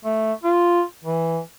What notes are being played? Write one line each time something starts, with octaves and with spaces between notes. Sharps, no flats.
A3
F4
E3